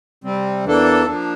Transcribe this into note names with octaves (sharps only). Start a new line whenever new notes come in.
C3 G3 C4
E2 E3 A#3 D4 A4
F3 A#3 D4